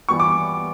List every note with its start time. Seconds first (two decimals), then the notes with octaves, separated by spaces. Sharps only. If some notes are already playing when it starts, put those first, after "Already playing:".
0.09 E3 G3 B3 C#6
0.20 D6